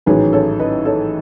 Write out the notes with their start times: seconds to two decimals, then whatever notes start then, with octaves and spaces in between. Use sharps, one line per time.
0.06 A1 G#2 D#3 F#3 C#4 G#4 B4
0.33 A4 C#5
0.59 B4 D#5
0.85 A4 C#5